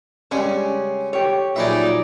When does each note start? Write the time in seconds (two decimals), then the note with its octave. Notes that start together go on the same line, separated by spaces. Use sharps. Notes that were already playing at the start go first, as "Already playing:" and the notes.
0.31 C#3 G3 G#3 C#4
1.13 G4 C#5
1.56 A#2 F3 F#3 D#4 G#4 B4 D5 E5